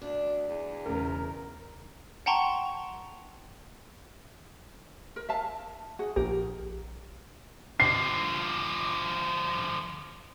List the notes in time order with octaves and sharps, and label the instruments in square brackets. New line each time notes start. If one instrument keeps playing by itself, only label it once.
[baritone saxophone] D2 [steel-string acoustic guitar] D4
[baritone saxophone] E2
[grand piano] E1 C#3 [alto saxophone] A#4
[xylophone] F#5 G5 A5 A#5 C6 C#6
[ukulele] A#4
E5 F5 A5
F#4 G#4 F#5
[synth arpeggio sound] A#1 G4 [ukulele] A#4
[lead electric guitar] D3 F3 [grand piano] C7